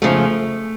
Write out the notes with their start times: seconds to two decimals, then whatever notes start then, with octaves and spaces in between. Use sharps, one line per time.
0.02 F2 C#3 F3 A3